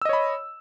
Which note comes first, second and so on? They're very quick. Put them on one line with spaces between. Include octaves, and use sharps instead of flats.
E6 D#5 C#5 B5